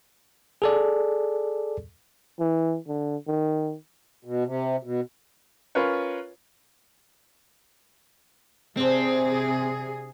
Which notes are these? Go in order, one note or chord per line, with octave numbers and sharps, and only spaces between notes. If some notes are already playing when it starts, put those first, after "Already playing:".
G#4 A4 D5
E3
D3
D#3
B2
C3
B2
C#4 F4 A#4 B4 C#5
C3 C4 D4 G#4 C5